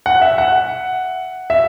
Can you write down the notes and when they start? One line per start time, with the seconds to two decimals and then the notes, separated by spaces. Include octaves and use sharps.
0.06 F#5
0.22 E5
0.38 F#5
1.50 E5